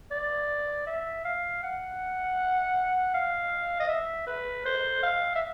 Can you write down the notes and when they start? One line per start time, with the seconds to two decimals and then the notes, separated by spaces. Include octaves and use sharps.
0.11 D5
0.86 E5
1.25 F5
1.63 F#5
3.14 F5
3.80 D#5
3.89 E5
4.27 B4
4.65 C5
5.02 F5
5.35 E5